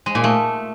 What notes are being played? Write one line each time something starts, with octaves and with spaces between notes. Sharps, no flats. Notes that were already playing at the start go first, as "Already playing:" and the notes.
G#3
A#2
A3